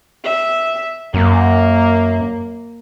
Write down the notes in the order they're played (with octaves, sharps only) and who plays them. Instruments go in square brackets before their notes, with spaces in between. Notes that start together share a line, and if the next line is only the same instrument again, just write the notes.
[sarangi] E5
[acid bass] F#2 [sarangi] A#3